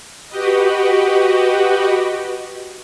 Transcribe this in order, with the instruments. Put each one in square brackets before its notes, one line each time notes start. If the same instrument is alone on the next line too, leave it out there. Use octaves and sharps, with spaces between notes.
[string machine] F#4 G4 B4 D#5